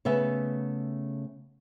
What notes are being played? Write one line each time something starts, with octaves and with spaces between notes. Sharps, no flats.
C#3 A3 B3 E5